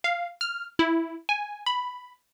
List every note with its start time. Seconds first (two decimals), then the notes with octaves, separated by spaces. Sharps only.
0.04 F5
0.41 F6
0.79 E4
1.29 G#5
1.66 B5